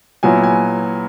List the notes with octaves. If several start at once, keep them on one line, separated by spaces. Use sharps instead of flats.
A#2 F#3 B3 E4 G#5
G#5